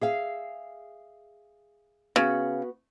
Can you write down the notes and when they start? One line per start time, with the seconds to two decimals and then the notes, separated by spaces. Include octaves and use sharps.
0.01 G#4 E5 F5
2.16 C#3 B3 F#4